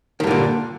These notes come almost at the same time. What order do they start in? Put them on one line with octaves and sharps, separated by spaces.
D#3 G2 D3 A#2